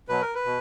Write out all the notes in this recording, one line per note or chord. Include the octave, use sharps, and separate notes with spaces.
B2 F#3 B4
A#4
B4
B2